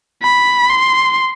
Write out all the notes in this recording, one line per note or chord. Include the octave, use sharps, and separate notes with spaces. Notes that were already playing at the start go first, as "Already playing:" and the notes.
B5
C6